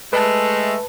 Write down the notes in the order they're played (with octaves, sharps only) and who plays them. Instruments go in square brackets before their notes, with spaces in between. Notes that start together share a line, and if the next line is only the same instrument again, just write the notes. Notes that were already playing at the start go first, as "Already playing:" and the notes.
[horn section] G#3 A3 [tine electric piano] B4 A5